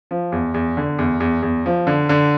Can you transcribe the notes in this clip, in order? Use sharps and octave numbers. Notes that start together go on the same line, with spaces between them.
F3
E2
E2
D3
E2
E2
E2
F3
D3
D3